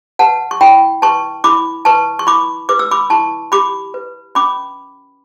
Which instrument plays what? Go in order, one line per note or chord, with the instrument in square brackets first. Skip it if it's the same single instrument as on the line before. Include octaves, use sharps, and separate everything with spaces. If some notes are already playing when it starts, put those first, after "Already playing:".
[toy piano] B4 F#5 A5
C#6
E4 G5 B5
B4 A5 C#6
E4 B5 D6
B4 A5 C#6
C#6
E4 B5 D6
B4 D6
E6
B5 D6
E4 A5 C#6
G4 B5 D6
B4
C#4 B5 D6